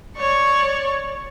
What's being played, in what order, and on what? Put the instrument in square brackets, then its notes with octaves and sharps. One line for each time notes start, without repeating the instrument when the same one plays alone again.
[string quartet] C#5 D5 C#6